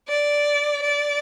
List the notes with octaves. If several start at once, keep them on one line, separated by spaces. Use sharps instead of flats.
D5
D5